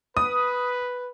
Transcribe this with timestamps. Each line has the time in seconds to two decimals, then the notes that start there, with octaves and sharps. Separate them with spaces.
0.17 B4 D#6